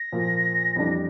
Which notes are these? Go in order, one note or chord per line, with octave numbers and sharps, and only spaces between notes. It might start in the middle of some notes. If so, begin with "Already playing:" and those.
Already playing: A#6
A#2 F3 A#3 F4
F2 E3 G3 D4